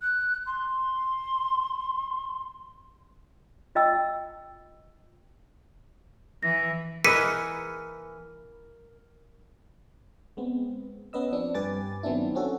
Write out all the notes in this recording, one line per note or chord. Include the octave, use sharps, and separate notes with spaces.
F#6
C6
F4 D#5 G5 E6
E3 A#6
E3 G#4 A#4 B4 D#5 B6 C#7 D#7
G#3 B3 C4
B3 C#4 B4 D#5 E6
F3 C4 D4
G2 G4 B4 G#5 D6 A6
D#3 F#3 B3 C4 D4 E4
C4 C#4 F#4 A4